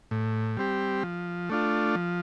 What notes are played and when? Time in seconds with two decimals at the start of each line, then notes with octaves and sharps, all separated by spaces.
0.11 A2
0.57 G3 C4 G4
1.03 F3
1.50 A3 D4 F4
1.95 F3